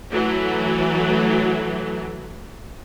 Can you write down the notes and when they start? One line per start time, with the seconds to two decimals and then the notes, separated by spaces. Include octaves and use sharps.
0.12 E3 F#3 A3